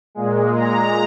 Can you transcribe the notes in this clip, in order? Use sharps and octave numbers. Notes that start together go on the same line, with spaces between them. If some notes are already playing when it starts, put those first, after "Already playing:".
A#2 G#3
A#5